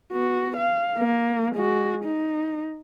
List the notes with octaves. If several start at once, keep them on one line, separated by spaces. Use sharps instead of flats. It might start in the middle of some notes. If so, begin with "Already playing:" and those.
B3 F#4
F5
A#3
G#3 F#4
D#4